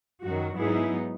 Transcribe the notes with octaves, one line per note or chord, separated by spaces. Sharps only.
F#2 D#3 F#3 F#4
G#2 F#3 B3 D#4 E4 G#4